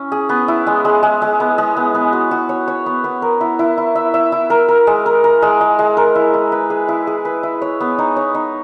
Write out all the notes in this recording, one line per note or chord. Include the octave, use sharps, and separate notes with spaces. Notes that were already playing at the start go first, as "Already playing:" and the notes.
Already playing: C#4 E4
G#4
B3
E4
G#3
G#3
G#3
G#3
B3
G#3
B3
B3
F#4
F#4
C#5
C#5
B3
B3
A#4
E4
E4
E4
E5
E5
E4
A#4
A#4
G#3
A#4
A#4
G#3
G#3
G#3
A#4
E4
E4
B4
G#4
E4
G#4
B4
E4
C#5
B3
D#4
C#5
D#4